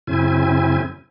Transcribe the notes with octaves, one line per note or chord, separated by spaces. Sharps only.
F#2 C#3 C4 E4 G#5